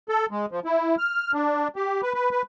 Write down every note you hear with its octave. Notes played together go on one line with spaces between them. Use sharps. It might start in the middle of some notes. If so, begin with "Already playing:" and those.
A4
G#3
F3
E4
F6
D4
G4
B4
B4
B4